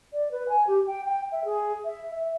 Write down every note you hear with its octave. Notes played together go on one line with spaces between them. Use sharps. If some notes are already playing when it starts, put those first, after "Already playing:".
D5
B4
G#5
G4
G5
G5
E5
G#4
E5
E5